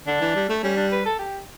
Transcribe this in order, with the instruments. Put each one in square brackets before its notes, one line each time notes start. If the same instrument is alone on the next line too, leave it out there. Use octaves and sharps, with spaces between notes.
[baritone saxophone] D3 [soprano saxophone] D4
[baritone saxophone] E3
G3
A3
[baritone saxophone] G3 [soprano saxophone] C#4
[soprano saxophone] D4
B4
A4
G4